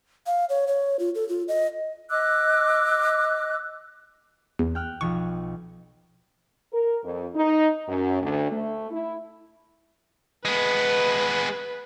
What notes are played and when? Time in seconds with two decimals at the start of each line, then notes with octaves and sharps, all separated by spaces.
0.27 F5
0.49 C#5
0.68 C#5
0.99 F4
1.15 A4
1.29 F4
1.48 D#5
2.10 D#5 D6 E6 F#6
4.59 E2
4.75 G5 F6 F#6
5.01 B1 F3 C#6
6.73 A#4
7.03 F2
7.34 D#4
7.88 F#2
8.22 D2
8.51 A3
8.90 E4
10.45 G#3 B3 B4